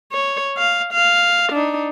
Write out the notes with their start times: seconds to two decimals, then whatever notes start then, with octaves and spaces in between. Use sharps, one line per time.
0.12 C#5
0.58 F5
0.93 F5
1.52 D4 D#4